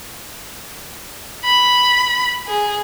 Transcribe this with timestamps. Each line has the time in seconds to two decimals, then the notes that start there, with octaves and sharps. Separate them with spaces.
1.45 B5
2.47 G#4